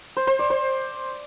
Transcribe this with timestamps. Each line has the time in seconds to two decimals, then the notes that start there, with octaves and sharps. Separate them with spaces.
0.17 C5
0.27 C5
0.39 D5
0.50 C5